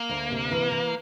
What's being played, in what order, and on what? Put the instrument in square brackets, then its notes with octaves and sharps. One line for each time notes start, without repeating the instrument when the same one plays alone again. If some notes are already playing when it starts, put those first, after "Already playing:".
Already playing: [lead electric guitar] A#3
[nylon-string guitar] D2
C3
E3
E3